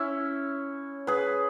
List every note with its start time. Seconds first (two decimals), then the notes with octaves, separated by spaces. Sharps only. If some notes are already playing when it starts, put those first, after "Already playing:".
Already playing: C#4 E4
1.07 G#4 B4